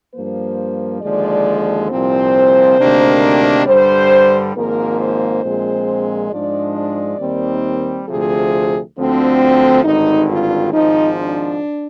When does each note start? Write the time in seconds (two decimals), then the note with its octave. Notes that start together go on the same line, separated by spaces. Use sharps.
0.13 G2 F3 A#3 C5
1.02 D#2 D3 F3 G#3 D5
1.90 C2 A#2 F3 C4 C5
2.78 D2 C3 D#3 A#3 D4
3.66 G2 D3 G3 C5
4.55 G#1 G#2 F3 A#3 A#4
4.99 C5
5.43 A#1 A#2 G#3 C4
6.31 G#2 F3 G#3 D4 D5
6.75 D5
7.19 D#2 D#3 G3 C4
8.07 D2 C3 F3 G#4
8.96 D2 D3 F3 C4
9.84 G#1 G2 D3 D#4
10.28 F4
10.72 G#1 G#2 F3 D#4
11.17 D4